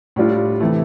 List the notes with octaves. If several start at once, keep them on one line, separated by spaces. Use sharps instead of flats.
A2 G3 D4 F4
C3 E3 A3